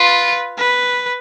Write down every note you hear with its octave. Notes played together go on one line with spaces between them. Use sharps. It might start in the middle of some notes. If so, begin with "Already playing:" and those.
Already playing: F4 B4
B4